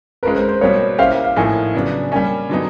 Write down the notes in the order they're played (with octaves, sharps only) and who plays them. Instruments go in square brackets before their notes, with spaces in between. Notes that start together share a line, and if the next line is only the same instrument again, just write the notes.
[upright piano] G#3 C#4 F4 A#4 [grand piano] B4
[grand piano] C5
C5
[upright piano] B2 G3 A#3 [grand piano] C#5
[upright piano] A#3 C#4 E4 G4 C5 [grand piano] F5
[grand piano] F5
F5
[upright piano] A2 F3 A#3 D#4 [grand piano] G#5
[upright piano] C#3 F#3 B3 D4
[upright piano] G3 A#3 C#4 [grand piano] G#5
[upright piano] D3 F#3 B3 D#4